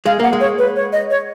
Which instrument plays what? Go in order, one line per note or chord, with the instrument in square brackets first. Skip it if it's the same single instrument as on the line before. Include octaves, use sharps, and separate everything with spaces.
[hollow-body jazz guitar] G#3 [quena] F5
[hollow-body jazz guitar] A#3 [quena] F#5
[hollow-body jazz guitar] G#3
[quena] C#5
B4
C#5
D#5
C#5